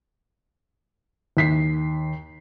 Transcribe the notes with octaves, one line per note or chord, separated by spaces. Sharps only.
D#2 B6 C7